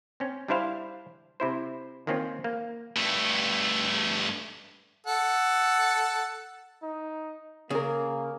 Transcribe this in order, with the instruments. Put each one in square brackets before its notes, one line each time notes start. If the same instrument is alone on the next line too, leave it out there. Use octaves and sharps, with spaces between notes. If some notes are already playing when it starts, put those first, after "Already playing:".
[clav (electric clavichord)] C4 C#4
G3 D4 E4 C5 F5
C3 E4 C5
D#3 A#3 C4 C#4 F4
A#3
[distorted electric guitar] G2 A3
[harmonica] A4 F#5
[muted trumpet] D#4
[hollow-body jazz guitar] C#3 [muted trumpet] A#3 [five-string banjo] G#4 A#4